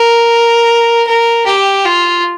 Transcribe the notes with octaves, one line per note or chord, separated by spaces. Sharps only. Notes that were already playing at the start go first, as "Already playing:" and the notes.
Already playing: A#4
A#4
G4
F4